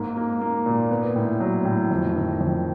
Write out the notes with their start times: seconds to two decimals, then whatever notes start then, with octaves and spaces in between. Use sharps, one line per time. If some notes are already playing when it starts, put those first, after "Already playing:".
Already playing: G#2 A#3
0.17 A#3
0.41 A#3
0.66 A#2
0.91 B3
1.16 A2
1.40 F#3
1.65 A2
1.91 F2
2.16 D#3
2.40 F2